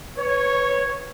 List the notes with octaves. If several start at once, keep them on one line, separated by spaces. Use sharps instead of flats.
B4 C#5